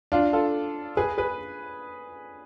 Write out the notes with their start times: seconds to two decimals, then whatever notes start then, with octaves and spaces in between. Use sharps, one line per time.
0.12 D4 F4
0.33 F4 A4
0.97 G#4 B4
1.18 G#4 B4